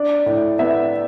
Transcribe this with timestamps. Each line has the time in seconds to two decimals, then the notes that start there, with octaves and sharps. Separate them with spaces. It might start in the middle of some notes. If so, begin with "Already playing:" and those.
Already playing: D4 D5
0.26 A2
0.59 B3 E5